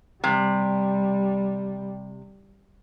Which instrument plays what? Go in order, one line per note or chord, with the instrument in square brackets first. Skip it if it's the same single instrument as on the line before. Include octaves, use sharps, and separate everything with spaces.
[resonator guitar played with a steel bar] C3 [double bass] G3